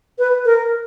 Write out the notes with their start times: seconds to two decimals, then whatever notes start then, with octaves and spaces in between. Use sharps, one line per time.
0.19 B4
0.45 A#4